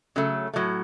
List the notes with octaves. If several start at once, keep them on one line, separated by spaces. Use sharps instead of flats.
C#3 F#3 A3
A2 F#3 A3